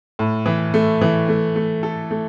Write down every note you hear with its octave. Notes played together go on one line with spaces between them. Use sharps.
A2
E3
A3
E3
A3
A3
A4
A3